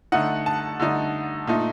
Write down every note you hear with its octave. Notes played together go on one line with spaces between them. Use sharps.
D3 A3 D#4 F#5
A5
D3 A3 D#4
A#2 A3 D#4